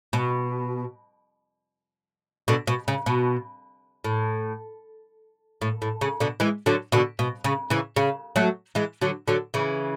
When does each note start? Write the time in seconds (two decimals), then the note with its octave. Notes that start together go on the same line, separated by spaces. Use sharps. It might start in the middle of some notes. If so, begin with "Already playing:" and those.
0.13 B2
2.48 B2 D3
2.67 B2
2.88 C#3
3.06 B2
4.04 A2
5.62 A2
5.82 A2
6.01 C#3
6.20 B2 D3
6.40 E3 G#3
6.66 D3 F#3
6.92 B2 D3
7.19 B2
7.44 C#3
7.70 C#3 E3
7.96 C#3
8.36 F#3 A3
8.75 E3 G#3
9.01 D3 F#3
9.28 D3 F#3
9.54 C#3 E3